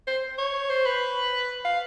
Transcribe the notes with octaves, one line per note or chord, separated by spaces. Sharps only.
C5
C#5
C5
B4
F5